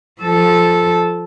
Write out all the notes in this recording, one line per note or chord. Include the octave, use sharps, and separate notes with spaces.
F3 A4